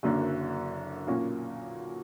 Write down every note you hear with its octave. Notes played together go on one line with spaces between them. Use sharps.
F#1 F#2 D3 A#3
B1 A#2 A#3 C#4 F#4